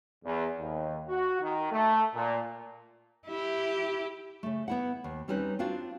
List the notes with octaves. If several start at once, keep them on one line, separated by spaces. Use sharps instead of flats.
E2
D#2
F#4
D#3
A3
A#2
E4 G4
C#3 A3
B3 E4 F#5
D#2
G3 C4 C#4 D#4 B4
C4 D4 F4 F#4